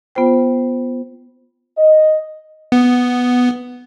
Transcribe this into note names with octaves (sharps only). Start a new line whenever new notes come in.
B3 F4 C5 G5
D#5
B3